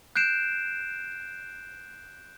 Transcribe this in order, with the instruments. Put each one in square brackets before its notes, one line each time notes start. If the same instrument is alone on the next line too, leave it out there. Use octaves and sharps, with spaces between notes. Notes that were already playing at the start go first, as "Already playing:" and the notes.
[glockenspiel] F#6 G6 C7 D7 E7